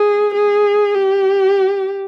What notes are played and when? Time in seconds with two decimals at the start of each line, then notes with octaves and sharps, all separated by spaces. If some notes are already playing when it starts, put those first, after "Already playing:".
Already playing: G#4
0.35 G#4
0.95 G4